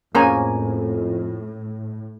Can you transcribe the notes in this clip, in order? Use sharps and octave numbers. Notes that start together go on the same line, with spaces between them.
F2 A2 A#3 C#4 G#4 C5 G#5 A#5